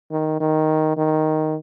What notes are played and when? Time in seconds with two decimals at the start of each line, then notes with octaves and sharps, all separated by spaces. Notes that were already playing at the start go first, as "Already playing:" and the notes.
0.11 D#3
0.40 D#3
0.97 D#3